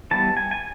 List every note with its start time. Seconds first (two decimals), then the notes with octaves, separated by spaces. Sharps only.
0.11 E3 G3 B3 A5
0.37 G#5
0.51 G#5